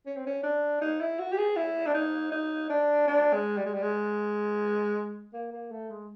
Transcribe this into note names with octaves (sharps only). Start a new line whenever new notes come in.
C#4
C4
C#4
D4
D#4
E4
F#4
G4
G#4
E4
D4
D#4
D#4
D4
D4
G#3
G3
G#3
G3
G#3
A#3
A#3
A3
G#3